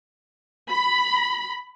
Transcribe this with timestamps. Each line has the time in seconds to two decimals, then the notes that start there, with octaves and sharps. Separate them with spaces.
0.70 B5